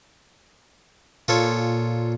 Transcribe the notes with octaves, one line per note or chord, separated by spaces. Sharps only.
A#2 F4 A4 C#5